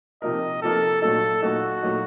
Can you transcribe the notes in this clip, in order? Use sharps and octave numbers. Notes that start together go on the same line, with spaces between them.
C3 F3 A#3 D#4 A#4 D#5
C3 F3 A#3 D#4 A4 A#4
A#2 F#3 A3 D#4 A4
A#2 F#3 A3 D#4 F#4
A#2 F#3 A3 D#4